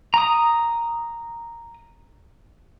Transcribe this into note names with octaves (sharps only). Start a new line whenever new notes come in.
A#5 D#6